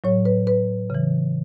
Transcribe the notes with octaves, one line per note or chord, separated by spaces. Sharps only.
A2 F#3 C#5
B4
B4
C#3 E3